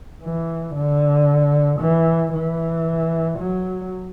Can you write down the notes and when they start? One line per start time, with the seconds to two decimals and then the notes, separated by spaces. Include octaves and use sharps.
0.22 E3
0.75 D3
1.80 E3
2.32 E3
3.38 F#3